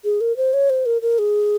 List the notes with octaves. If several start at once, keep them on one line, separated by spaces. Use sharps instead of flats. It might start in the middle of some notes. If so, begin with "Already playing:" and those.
G#4
A#4
C5
C#5
C5
A#4
A#4
G#4